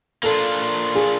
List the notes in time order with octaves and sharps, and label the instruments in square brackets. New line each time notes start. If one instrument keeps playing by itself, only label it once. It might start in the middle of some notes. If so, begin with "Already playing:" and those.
[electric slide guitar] A#3 D4 F4 [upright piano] A4
[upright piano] G#4